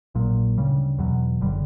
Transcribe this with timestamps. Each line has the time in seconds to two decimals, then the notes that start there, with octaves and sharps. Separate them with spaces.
0.15 A#1 A#2 F#3
0.58 D2 C#3 G3
0.99 E2 B2 F#3
1.41 F#1 D3 G3